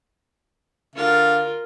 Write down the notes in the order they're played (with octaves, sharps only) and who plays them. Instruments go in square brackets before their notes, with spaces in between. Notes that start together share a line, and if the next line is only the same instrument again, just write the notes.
[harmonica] D3 F5 [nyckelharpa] F4 A#4